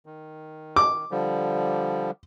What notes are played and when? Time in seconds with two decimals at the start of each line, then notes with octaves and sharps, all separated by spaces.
0.06 D#3
0.76 D6
1.11 D3 F3 G3